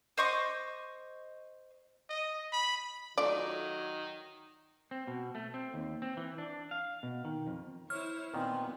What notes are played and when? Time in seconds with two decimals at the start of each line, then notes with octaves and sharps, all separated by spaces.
0.17 C5 D#5 C#6 D6
2.09 D#5
2.53 B5
3.18 D#3 F#3 A3 F4 D5
4.91 C4
5.07 B2
5.35 A3
5.54 C4
5.74 D#2
6.02 C4
6.17 E3
6.38 D4
6.71 F5
7.03 B2
7.25 D#3
7.47 F2
7.90 E4 C5 C#5 F6
8.34 A#2 D#3 B3 C4